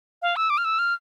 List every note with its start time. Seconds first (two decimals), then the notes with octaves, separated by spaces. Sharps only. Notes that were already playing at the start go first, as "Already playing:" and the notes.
0.22 F5
0.36 E6
0.50 D6
0.58 F6
0.65 E6
0.79 F6